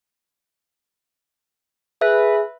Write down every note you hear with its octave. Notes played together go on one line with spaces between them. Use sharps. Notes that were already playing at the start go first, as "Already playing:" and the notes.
G#4 B4 E5